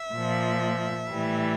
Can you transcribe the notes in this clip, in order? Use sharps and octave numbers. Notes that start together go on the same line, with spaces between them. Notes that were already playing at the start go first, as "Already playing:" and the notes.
Already playing: E5
A#2 F3
A2 E3 G3